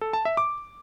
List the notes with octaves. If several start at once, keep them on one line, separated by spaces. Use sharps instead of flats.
A4
A5
E5
D6